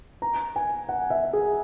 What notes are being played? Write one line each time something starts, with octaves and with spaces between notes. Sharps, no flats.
A#5
G#5
F#5
E5
G#4